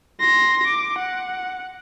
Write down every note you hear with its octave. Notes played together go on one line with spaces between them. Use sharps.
C6 A#6
D6
F#5